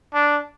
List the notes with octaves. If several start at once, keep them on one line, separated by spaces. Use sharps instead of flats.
D4